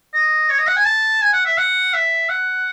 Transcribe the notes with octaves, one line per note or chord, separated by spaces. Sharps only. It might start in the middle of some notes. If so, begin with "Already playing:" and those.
D#5
C#5
D#5
F#5
G#5
A5
G#5
F#5
E5
F#5
E5
F#5